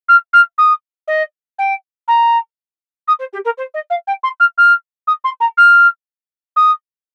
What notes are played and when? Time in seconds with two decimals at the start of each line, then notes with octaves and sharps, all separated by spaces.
0.08 F6
0.33 F6
0.58 D#6
1.07 D#5
1.58 G5
2.08 A#5
3.07 D#6
3.19 C5
3.33 G4
3.45 A#4
3.57 C5
3.74 D#5
3.90 F5
4.07 G5
4.23 C6
4.40 F6
4.57 F6
5.07 D#6
5.24 C6
5.40 A#5
5.57 F6
6.56 D#6